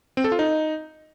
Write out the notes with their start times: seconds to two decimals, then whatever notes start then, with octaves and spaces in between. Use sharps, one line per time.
0.17 C4
0.24 A4
0.32 F4
0.39 D#4